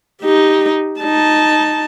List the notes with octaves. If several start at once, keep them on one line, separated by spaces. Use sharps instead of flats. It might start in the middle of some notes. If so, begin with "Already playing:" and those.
D#4 G4
D#4 A5